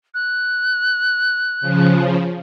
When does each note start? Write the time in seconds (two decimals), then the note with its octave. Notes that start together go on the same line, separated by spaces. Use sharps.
0.14 F#6
1.61 C#3 F3